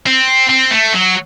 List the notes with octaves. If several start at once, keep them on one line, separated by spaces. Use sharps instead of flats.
C4
C4
A3
F#3